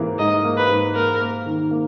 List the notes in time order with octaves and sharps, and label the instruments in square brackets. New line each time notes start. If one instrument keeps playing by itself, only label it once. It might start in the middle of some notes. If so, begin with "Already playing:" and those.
Already playing: [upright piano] G#2 E3 A#3
[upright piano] G#2 [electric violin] D#5
[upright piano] A#3
[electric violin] B4
[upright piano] G#2
[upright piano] A#3 [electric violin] A#4
[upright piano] A#3
D#3
A#3